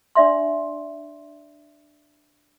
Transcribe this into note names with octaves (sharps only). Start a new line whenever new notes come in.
D4 D5 E5 C6